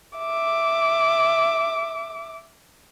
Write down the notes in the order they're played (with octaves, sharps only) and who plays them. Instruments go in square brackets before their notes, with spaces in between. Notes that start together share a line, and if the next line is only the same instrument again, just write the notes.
[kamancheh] E5 D6